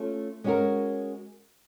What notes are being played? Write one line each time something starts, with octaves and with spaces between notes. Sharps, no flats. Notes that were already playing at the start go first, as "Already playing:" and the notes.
Already playing: A3 C#4 F4
G#3 C#4 F#4 A#4